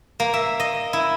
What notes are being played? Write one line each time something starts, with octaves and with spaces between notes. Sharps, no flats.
A#3
E5
D#5
E4